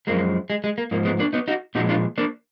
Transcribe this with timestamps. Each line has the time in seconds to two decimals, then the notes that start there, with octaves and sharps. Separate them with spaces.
0.07 F#2 F3 G#3 A#3
0.50 G#3
0.64 G#3
0.78 A#3
0.91 G#2 F3 A#3
1.05 G#3 B3
1.19 A#3 D4
1.33 B3 D#4
1.48 D#4 F#4
1.75 A#2 F3 G#3 D#4 F#4
1.89 D4 F4
2.18 A#3 D4